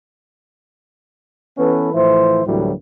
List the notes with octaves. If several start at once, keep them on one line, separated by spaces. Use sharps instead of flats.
E3 B3 C#4 A4 B4
A2 E3 F3 E4 C5
D2 A2 E3 F#3 G3 A#3